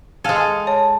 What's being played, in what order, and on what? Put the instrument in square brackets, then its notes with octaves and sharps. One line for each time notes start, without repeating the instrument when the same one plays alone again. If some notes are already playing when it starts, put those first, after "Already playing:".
[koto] G#3 A4 [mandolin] F5 G#5
[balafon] C#5 [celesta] A5